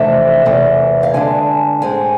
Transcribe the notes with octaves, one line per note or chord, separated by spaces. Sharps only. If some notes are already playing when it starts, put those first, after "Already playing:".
Already playing: F2 C3 E3 A3 D4 E5
E2 C3 E3 A3
F5
D3 G#3 D4 G#5
A2 G#3 C4 G#5